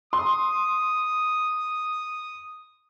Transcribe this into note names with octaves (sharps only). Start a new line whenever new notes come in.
C6 D#6